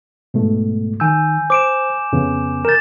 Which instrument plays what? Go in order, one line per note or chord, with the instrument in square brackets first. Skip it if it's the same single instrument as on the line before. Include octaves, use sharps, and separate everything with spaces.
[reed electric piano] G#2 B2 A3
[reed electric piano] D#3 E6 [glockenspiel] G#5 G6
[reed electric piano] C5 [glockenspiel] D6 D7 E7
[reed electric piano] F2 C#3 B3
[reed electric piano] A#4 G6 [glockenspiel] A6 E7